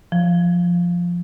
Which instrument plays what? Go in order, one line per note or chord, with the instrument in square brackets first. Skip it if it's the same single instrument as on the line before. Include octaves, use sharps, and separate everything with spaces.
[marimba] F3